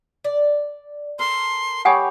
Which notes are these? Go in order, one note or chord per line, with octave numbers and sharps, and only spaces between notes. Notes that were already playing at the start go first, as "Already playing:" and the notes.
D5
A4 A#4 C6
G4 C#5 F#5 G#5 B5 D#6